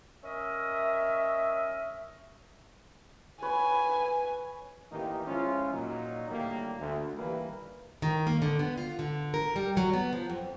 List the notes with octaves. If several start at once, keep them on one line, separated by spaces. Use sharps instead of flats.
C#4 A#4 D#5 E5
B4 C#5 G#5 B5
A1 D#3 E3 A#3 D#4 G4
F3 G#3 C#4 E4 F4
A#2 F#3 D#4
D2 A2 D#3 G3 A#3
D2
D#2 E3 G3 A#3 B4
D#3
A#3
D3
B3
F4
D3
A#4
G3
F#3
B3
F3
F2